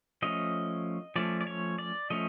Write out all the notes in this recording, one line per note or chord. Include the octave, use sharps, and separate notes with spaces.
F3 A3 C#4 D#5
F3 A3 C#4 D5
D5
C#5
D5
F3 A3 C#4 D#5